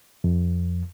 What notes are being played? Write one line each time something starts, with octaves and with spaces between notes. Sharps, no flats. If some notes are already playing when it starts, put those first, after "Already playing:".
F2